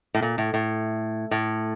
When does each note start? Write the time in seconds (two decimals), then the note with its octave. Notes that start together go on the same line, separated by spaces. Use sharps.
0.14 A2
0.22 A#2
0.38 A2
0.54 A2
1.31 A2